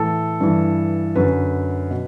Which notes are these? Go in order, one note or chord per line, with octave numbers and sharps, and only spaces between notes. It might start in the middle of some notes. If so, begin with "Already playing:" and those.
Already playing: A2 E3 A4
G2 E3
F#2 D3 B4
B2